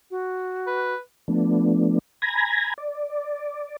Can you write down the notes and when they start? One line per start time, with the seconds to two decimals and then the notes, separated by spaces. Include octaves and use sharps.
0.11 F#4
0.67 B4
1.28 F3 A3 B3 D4
2.22 G#5 A#5 B5 G#6 A#6
2.78 D5